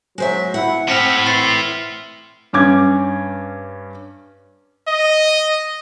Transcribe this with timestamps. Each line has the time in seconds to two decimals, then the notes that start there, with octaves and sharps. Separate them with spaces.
0.18 F#3 G#3 C5 E5
0.54 E4 F#5
0.88 A2 C4 F6 B6 C#7
1.26 E3 C6 A6 C7
2.53 G2 C#4 D6 G#6
4.88 D#5